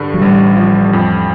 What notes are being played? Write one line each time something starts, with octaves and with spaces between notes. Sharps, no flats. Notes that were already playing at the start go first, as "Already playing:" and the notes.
Already playing: G2 D3
F#3
A1 G3
F3
F2